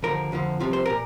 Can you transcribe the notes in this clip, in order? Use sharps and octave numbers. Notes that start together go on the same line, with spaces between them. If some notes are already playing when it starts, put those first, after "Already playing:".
D#2 D3 F3 A#4
F2 D3 F3
C2 C3 F3
C5
A#2 A#4